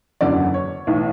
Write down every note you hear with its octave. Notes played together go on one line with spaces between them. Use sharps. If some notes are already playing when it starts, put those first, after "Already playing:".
F#1 E2 D3 F#3 C#4 D5
C#5
B1 A2 E3